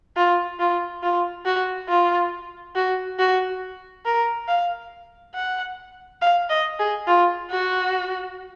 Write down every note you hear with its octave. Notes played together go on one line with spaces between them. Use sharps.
F4
F4
F4
F#4
F4
F#4
F#4
A#4
F5
F#5
F5
D#5
G#4
F4
F#4